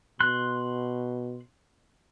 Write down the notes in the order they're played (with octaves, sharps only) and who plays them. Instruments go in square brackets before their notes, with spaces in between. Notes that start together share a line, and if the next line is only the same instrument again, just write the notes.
[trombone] B2 [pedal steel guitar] C6 F#6